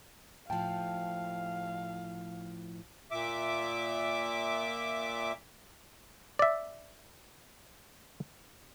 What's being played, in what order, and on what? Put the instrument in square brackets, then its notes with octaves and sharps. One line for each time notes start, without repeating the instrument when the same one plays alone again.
[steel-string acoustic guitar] A2 F3 [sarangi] F5 [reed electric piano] G5 A5
[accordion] A#2 E5 D6
[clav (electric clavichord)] D5 E5